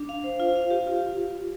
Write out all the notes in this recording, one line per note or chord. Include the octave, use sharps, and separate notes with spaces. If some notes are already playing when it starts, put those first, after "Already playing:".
Already playing: D4
F5
C5
F4
F5
G4
F4